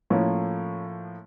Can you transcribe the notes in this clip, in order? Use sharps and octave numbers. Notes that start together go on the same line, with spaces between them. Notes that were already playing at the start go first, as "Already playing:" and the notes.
A2 F3 A#3 C#4